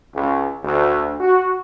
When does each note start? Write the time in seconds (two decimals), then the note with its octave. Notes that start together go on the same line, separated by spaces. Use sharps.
0.15 C#2
0.63 D2
1.20 F#4